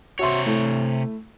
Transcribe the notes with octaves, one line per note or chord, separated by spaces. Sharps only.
C3 F#4 C#5 E5 C6
A3 E4